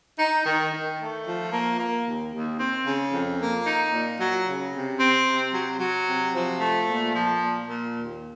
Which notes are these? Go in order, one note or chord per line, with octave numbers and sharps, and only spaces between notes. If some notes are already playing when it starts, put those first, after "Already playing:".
D#4
D#3
D#3
A3
F3
A#3
A#3
D#2
D#2
C4
C#3
F2
A#3
D#4
A#2
F#3
C#3
C3
C4
C3
F#3
F#3
C3
F3
A3
A#2
F3
A#2
A#2
D#2